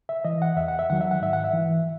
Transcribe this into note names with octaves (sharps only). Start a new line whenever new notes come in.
E5
E3 D#5
F#5
E2 E5
F#5
E5
D#3 F#3 F#5
E5
F#5
G#2 E5
F#5
E5
E3